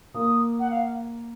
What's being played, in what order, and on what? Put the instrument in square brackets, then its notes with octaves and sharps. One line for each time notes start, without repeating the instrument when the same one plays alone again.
[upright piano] A#3 [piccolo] D#6
[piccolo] F#5
F5